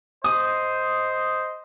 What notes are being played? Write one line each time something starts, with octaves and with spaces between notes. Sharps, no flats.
C5 D#5 D#6